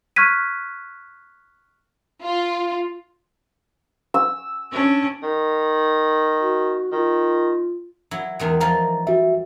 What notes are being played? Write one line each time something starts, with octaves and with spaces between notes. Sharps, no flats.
C#6 F6 F#6 G#6 B6 D#7
F4
E6
C#4 D4
D#3
F#4
D#3 F4
F#3 E4
E2 D#3 G#3
E3 F3 F4 A#5
G3 F#4 E5